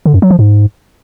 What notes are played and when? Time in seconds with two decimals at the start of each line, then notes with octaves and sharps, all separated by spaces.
0.06 D3
0.14 F#2
0.22 F#3
0.31 F3
0.39 G#2